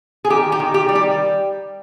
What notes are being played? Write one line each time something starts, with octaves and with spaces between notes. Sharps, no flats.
G#4
D#3 G4
G4
D#3
G4
G3
G4